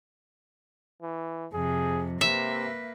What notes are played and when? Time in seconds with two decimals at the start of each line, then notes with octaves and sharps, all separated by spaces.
1.02 E3
1.53 F2 C3 G#4
2.21 C3 A#3 B4 E5